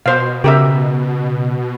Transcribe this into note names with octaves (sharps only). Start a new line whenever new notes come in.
B2 C5 F5
C#3 G4 A#4 E5